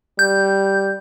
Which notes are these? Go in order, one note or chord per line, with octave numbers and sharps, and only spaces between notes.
G3 G6